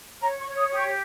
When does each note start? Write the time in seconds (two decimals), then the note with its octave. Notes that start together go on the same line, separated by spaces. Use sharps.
0.21 C#5 A#5
0.40 C#6
0.46 C#5
0.58 D#6
0.70 G4 D#6
0.77 C#6